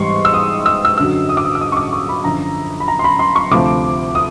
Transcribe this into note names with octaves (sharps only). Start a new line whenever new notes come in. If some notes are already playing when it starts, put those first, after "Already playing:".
Already playing: G#2 E3 G3 C6 C#6
E6
D#6
E6
E6
F#2 D3 F#3 E6
D#6
D6
D#6
E6
D#6
C#6
D6
C#6
B5
F#2 D3 F3 A#5
B5
A#5
C6
B5
C6
C#6
D2 C3 F3 D6
D#6